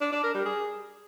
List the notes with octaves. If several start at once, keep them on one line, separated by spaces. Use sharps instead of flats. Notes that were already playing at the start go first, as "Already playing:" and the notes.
D4
D4
A#4
G3
G#4